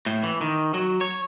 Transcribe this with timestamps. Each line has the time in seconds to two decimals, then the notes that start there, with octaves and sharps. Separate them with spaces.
0.06 A2
0.23 E3
0.41 D#3
0.74 F#3
1.01 C#5